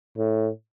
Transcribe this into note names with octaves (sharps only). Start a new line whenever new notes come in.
A2